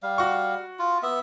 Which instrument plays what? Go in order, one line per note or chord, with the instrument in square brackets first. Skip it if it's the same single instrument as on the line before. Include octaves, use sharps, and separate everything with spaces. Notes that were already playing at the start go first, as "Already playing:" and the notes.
[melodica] G3 F5
[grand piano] F#4 C#6
[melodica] F4
B3 E5